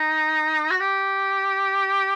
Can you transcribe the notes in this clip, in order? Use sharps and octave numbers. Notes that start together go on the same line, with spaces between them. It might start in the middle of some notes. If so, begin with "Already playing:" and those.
Already playing: D#4
F#4
G4